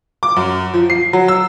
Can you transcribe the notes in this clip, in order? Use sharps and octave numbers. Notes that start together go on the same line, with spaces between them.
D6
F#2
F3
C7
F#3
E6